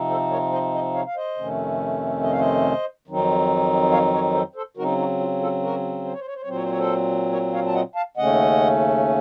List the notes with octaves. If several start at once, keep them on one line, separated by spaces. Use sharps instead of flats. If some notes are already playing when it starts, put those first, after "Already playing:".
Already playing: C3 F3 C4 D#4
A4 C5
A#4 C#5
C5 D#5
C5 D#5
C#5 F5
F5
C5 D#5
F2 C3 D#3 A3 C#4
D#5
F5
C5 D#5
F2 D#3 F#3 C4 D#4
C#5 F5
A#4 C#5
A4 C5
A4 C5
C#3 F#3 C4 D#4 F#4 A#4
D#4 F#4
F4
F4 A4
F#4 A#4
C5
C#5
C5
C#5
C5
C#5
A#2 F#3 C4 C5
C#5
C5
C#5
A4 C5
A#4 C#5
C#5 F5
A5
D#5 F#5
F5 A5
D#2 C#3 A3 C#4 D#5 F#5